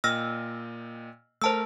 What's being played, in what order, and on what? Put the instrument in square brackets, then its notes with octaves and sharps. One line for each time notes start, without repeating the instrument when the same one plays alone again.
[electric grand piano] A#2 D#5 G5 [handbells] E6 F6 A#6
[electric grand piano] A3 A#4 [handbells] C5 A5 E6